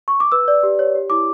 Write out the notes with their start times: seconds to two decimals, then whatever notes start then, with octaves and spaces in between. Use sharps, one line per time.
0.08 C#6
0.20 D6
0.32 B4 E6
0.48 D5
0.63 G4
0.79 C#5
0.95 G4
1.10 E4 D6